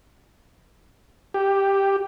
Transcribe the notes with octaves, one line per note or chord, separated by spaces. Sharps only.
G4